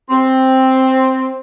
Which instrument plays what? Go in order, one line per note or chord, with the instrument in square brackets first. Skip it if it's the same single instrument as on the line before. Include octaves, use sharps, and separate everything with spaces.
[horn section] C4